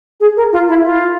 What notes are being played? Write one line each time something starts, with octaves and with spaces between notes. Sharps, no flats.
G#4
A#4
F4
E4
F4